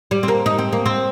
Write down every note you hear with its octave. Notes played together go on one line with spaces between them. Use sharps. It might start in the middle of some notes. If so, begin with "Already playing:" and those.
G3
C4
A#3
D#4
C4
A#3
C4